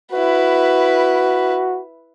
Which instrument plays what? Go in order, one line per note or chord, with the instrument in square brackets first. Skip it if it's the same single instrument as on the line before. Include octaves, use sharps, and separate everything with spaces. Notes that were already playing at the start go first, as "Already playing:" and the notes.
[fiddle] E4 B4 [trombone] F#4